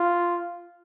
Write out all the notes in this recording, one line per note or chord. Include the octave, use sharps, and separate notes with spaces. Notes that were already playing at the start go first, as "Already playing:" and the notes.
Already playing: F4